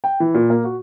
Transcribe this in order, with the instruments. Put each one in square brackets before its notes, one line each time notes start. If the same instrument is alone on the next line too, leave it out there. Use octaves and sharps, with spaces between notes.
[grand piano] G5
E3
A#2
A#3
F#4